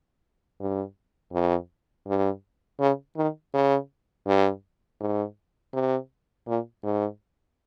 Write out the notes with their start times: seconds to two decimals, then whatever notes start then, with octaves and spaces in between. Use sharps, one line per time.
0.60 G2
1.33 F2
2.07 G2
2.80 C#3
3.17 D#3
3.54 C#3
4.27 G2
5.01 G#2
5.74 C3
6.47 A#2
6.84 G#2